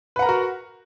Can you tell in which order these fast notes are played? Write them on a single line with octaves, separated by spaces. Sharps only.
B4 F#5 A#5 A#4 F#4